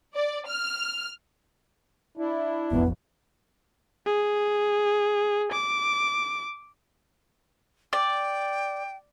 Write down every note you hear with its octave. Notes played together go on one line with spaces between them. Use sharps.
D5
F6
D4 E4
E1 A1 F2 B3
G#4
D6
D5 G5